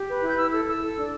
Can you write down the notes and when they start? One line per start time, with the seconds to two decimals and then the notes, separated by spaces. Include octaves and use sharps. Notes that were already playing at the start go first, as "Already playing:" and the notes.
Already playing: G4
0.08 B4
0.22 E4
0.28 G6
0.38 E4 E6
0.52 A4 E6
0.68 E4 E6
0.82 A4
0.97 D4